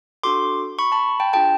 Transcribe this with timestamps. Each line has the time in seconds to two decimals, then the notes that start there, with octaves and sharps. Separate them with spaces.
0.23 D4 F#4 A4 C6 D6
0.79 B5 C#6
0.92 A5 B5
1.20 G5 A5
1.33 D4 F4 G#4 G5 A5